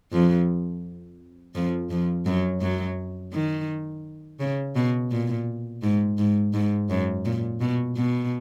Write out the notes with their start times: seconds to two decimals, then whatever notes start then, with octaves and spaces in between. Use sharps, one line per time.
0.12 F2 F3
1.55 F2 F3
1.90 F2 F3
2.26 F#2 F#3
2.61 F#2 F#3
3.33 D#3
4.40 C#3
4.76 B2
5.11 A#2
5.82 G#2
6.18 G#2
6.54 G#2
6.90 F#2
7.25 A#2
7.61 B2
7.96 B2